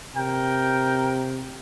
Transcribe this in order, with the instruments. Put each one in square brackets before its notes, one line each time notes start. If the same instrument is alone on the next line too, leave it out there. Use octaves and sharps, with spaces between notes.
[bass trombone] C3 [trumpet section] A#4 G5